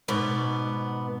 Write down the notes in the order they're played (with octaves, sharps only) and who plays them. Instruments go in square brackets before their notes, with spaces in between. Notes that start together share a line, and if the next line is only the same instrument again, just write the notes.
[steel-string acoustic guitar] G#2 B2 B3 D5